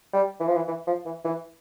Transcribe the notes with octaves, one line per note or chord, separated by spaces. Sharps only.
G3
E3
F3
E3
E3
F3
E3
E3